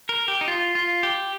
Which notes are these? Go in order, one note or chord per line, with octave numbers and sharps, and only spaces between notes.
A#4
G4
D#4
F4
F4
G4